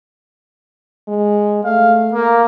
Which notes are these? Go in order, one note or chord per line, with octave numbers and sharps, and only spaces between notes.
G#3
A3 F5
A#3